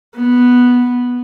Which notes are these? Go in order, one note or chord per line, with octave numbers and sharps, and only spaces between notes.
B3